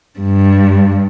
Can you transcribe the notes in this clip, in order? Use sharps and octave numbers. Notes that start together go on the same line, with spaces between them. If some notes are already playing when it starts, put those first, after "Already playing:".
G2